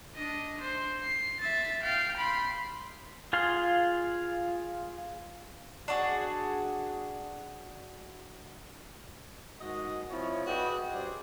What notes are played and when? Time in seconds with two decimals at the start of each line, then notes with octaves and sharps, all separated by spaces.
0.15 D4 D#5
0.61 C5
1.01 C7
1.40 E5 A6
1.83 F5 G5
2.17 B5 C6
3.33 F4 G#4 F5 C6
5.88 D4 F#4 G#4
9.60 G#2 D#3 F#4 D#5
10.09 F3 C4 E4 C#5
10.46 F#4 G#4 B4 D5 D#5 G5
10.92 G2 C#3 F#3 G#4 C5 D5